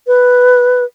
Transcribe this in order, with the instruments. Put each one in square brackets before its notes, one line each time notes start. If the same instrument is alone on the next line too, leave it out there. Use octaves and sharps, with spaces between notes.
[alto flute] B4